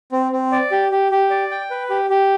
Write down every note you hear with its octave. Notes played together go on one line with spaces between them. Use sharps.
C4
C4
D5
G4
G4
G4
D5
G5
B4
G4
G4